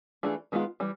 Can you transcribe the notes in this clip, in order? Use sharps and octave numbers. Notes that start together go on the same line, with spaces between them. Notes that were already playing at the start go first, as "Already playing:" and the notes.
E3 A3 D4 F4 G#4
D#3 G#3 B3 D4 F4
E3 G3